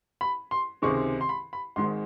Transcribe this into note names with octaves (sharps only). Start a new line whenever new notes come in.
B5
C6
C#2 C3 D#3 G#3 C4 C#6
C6
B5
B5
G#1 G#2 D#3 G#3 C6